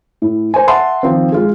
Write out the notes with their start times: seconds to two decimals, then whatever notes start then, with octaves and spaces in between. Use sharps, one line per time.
0.22 A2
0.54 C5 G#5
0.67 E5 F#5 A5 C6
1.03 D#3 F3 C4
1.32 G#3 F4 G#4